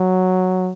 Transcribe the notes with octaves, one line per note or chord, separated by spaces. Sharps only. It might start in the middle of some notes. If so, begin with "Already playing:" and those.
Already playing: F#3